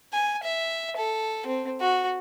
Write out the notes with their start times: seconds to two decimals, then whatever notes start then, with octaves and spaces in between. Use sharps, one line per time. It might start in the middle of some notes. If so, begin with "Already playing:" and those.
0.13 G#5
0.43 E5
0.97 A4
1.47 C4
1.81 F#4